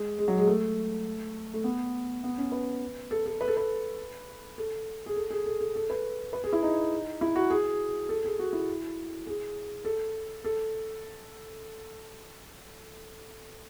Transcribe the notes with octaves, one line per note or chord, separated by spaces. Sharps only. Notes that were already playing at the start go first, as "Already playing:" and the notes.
Already playing: G#3
G#3
F#3
G#3
A3
A3
B3
B3
C#4
B4
A4
A4
B4
A4
B4
A4
G#4
A4
G#4
A4
A4
A4
B4
B4
G#4
E4
D#4
E4
F#4
G#4
A4
G#4
F#4
E4
G#4
A4
A4